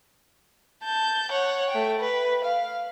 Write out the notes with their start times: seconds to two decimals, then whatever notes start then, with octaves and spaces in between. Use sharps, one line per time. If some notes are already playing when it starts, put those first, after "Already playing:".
0.84 A5 G6
1.31 C#5 F#5
1.70 A3 G5
1.99 B4
2.44 F5